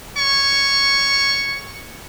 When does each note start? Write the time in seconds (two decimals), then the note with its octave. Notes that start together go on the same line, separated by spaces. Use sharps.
0.17 C#5 C#6